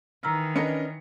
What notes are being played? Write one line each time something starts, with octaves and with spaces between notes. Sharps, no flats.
D#3 E3 A#5 E6 F6
C#4 D4 A#4 B4 D#5 C#7